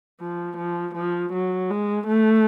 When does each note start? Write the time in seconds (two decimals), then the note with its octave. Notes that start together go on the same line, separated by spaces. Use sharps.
0.21 F3
0.58 F3
0.95 F3
1.33 F#3
1.70 G#3
2.08 A3